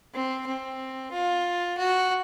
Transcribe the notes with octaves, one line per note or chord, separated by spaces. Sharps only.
C4
C4
F4
F#4